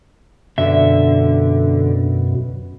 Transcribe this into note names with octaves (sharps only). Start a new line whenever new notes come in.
F#2 B2 D3 E5